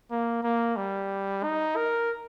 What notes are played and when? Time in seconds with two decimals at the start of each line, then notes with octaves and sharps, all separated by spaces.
0.11 A#3
0.43 A#3
0.77 G3
1.43 D#4
1.76 A#4